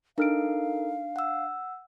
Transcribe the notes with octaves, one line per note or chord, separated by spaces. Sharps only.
D4 D#4 A4 A#4 F5 F6 D7
F#5 E6